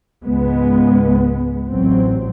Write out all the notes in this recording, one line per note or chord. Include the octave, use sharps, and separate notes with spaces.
C#2 G#2 G#3 B3
A1 F#3 C4